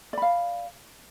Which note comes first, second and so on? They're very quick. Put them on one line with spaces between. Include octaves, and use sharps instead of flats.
D5 B5 F5